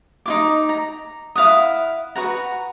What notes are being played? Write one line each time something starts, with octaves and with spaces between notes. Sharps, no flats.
D#4 F4 D6
A#5
E4 F5 F#5 D#6
F#4 B4 F#5 A#5